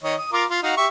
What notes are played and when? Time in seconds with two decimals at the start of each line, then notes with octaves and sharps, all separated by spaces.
0.04 D#3 C#5 D#5
0.18 D#6
0.33 F4 A#4 D6
0.50 F4
0.63 D#4 F#4 F5
0.77 G4 E5 C#6